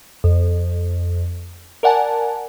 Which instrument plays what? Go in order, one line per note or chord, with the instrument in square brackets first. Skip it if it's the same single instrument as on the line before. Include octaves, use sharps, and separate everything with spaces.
[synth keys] F2
A#4 D5 F#5 G#5 A5